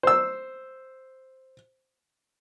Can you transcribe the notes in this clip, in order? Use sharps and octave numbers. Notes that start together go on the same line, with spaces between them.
C5 E6